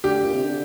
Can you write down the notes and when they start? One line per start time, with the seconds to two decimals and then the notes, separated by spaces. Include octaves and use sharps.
0.04 D3 G4
0.24 A#2
0.34 C3
0.44 D3